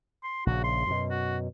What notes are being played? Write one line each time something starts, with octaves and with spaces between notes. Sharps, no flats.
C6
A#1 C#3 F#4
C6
F#2 B2
F#4